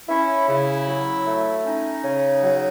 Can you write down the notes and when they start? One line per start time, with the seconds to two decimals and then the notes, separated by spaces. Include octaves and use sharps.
0.09 C#4 E4
0.47 C#3 E4
0.86 F#3
1.25 A3
1.64 C#4 D#4
2.03 C#3
2.42 F#3